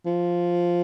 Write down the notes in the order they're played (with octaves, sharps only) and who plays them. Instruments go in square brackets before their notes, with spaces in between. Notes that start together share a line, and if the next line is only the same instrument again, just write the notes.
[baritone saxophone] F3